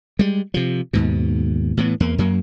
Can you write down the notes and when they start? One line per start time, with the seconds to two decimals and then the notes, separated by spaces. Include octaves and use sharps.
0.19 G3 G#3
0.54 C3 F3
0.93 D#2 G#2 B2
1.77 A2 E3 B3
2.00 E2 A#3
2.18 F#2 F#3 A#3